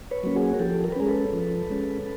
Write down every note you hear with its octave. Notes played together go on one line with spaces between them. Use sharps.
B4 C#5
F#3 A#3 C#4
F#4 G#4
A#4
F3 G4 A4
A#4
B4
G#3 C#4 G#4 A#4
A4 B4
F3
G#3 C#4